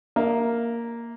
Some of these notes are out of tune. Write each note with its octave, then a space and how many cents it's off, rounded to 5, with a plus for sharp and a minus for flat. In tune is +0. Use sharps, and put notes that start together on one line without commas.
A#3 +0 E5 +0